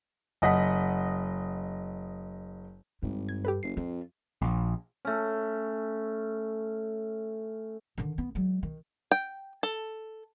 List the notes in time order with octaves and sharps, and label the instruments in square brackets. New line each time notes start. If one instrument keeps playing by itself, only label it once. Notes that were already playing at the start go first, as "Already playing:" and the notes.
[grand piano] F#1 D#5 F#5 B6
[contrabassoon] G#1 [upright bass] G2
[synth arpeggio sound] G#6
G4 A4 B4
[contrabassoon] F#1 [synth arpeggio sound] C7
[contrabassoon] F2 [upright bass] F4
[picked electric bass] A#1
[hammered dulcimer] A3 C#4
[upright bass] D3 D#3
B3
F#3 G#3
D#3
[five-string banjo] G5
A4